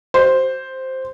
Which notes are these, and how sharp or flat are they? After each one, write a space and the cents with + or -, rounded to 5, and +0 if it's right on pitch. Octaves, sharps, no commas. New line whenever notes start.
F#4 +45 C5 +0